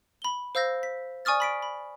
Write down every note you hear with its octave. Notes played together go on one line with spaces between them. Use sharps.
B5 G7
C5 F5 E6 G6 A#6
B6
D5 G#5 C#6 D#6 F6 A6
B5 B6 D7
B5